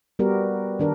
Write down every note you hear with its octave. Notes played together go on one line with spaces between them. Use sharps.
G3 B3 F#4 G4 A#4
D#3 D4 A#4